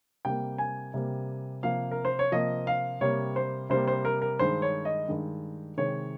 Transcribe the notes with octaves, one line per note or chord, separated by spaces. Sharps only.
C3 G3 A#3 G5
G#5
C3 G3 A#3
C3 F3 A#3 F5
A#4
C5
C#5
C3 F3 A#3 D#5
F5
C3 G3 A#3 C#5
C5
C3 G3 A#3 C5
C5
A#4
A#4
G2 D#3 G#3 C5
C#5
D#5
G2 D#3 G#3
C3 D#3 G#3 C#5